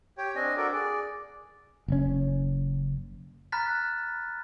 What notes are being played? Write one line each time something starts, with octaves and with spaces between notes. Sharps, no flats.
G4 C#5 G5
C4 D4 D#5 G#5
D4 F#4 A4 A#4 D5
G#4 D5
F#1 C#4
A#5 B5 F6 F#6 A6 B6